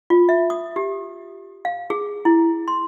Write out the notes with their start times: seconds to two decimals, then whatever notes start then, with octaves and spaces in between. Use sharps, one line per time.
0.10 F4
0.29 E5
0.50 D#6
0.76 G4
1.65 F5
1.90 G#4
2.25 E4
2.68 C6